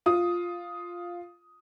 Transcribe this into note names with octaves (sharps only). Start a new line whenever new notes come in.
F4 D#6